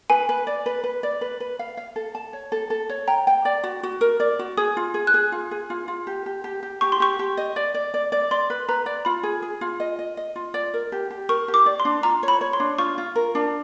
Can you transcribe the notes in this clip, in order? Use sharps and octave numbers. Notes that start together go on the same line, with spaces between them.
B4 G#5
B4
D5
B4
B4
D5
B4
B4
F5
F5
A4
A5
C#5
A4
A4
C#5
G5 A#5
G5
D5
F#4
F#4
A#4
D5
F#4
G#4 D#6
F4
G#4
F#6
G#4
F4
G#4
F4
F4
G4
G4
G4
G4
G4 C#6
C6
G4 C#6
G4
D#5
D5
D5
D5
D5
D5 C6
B4
B4 A#5
D5
F4 B5
G#4
G#4
F4
D#5
D#5
D#5
F4
D5
A#4
G4
G4
A#4 C#6
G4
D6
D5
C6
D4
F4 A#5
C#5
B5
C#5
C6
D4
F4 C#6
F4
A#4
D4